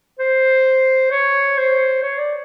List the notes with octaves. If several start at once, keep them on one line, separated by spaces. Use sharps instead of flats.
C5
C#5
C5
C#5
D5